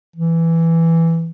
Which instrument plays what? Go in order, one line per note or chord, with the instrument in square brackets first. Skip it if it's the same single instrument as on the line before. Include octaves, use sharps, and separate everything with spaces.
[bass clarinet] E3